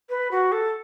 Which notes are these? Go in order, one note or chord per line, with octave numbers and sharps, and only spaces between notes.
B4
F#4
A4